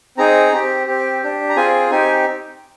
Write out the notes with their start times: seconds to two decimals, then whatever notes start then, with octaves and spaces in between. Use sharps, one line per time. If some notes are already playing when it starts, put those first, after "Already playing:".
0.17 C4 D#4 G#4 A#5
0.52 C4 G4
0.87 C4 G4
1.22 D4 G4
1.50 A#5
1.56 C4 F4 G#4 G#5
1.91 C4 D#4 G4 G#5